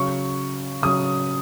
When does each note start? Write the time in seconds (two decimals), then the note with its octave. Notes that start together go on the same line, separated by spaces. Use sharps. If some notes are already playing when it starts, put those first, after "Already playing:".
Already playing: C#3 F#3 C#6
0.82 C#3 F#3 D#6